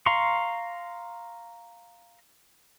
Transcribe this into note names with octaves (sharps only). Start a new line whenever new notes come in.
F5 A#5 C6 C#6